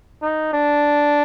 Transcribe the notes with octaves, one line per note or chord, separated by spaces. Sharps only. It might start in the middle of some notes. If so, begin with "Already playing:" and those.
D#4
D4